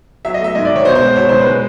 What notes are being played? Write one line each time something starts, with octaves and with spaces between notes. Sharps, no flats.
F#3 E5
D#5
A3 E5
G#2 D#5
D5
D#3 C#5
B2 C5
C5
G#3
B2 C#5
G#3 C5
B4
G#3